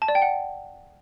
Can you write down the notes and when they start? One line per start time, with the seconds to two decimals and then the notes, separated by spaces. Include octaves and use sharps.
0.02 A5
0.08 D5
0.15 G5
0.22 F#5